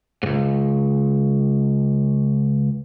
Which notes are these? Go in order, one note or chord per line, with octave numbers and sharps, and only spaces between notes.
C#2 G#2